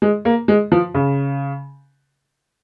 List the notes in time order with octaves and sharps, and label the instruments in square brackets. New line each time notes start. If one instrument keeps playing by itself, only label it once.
[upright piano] G#3
A#3
G#3
F3
C#3